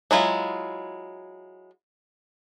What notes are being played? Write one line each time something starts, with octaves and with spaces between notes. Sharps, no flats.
F#3 G#3 E4 F4